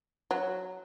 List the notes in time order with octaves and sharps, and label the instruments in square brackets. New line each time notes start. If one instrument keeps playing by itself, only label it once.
[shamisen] F#3